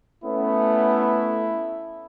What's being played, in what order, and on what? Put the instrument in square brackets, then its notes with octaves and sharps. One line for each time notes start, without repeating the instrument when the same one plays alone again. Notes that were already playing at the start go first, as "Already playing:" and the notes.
[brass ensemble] A3 B3 C#4 [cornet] E4